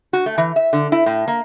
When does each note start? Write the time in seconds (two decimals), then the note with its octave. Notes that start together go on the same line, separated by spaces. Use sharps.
0.13 F#4
0.26 A3
0.38 E3
0.56 E5
0.73 D3
0.92 E4
1.06 A2
1.28 A#3